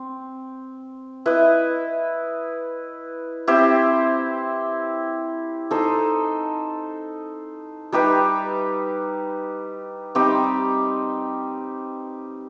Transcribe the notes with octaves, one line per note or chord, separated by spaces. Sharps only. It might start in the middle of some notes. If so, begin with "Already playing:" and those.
Already playing: C4
E4 B4 D#5
C4 E4 G4 C5
D#4 A4 C5 D#5
G3 D#4 G4 B4
G3 C4 D#4 G4